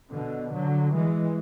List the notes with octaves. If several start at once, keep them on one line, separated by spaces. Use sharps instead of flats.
B2 D3
D3 F#3
E3 G#3